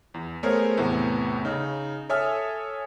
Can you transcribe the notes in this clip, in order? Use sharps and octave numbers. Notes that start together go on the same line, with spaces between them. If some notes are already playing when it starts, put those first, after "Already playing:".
E2
A3 B3 G#4 A#4 C5 C#5
E2 A2 C3 A3 B3
C#3 D#4
A4 C#5 E5 G#5 D#6 F6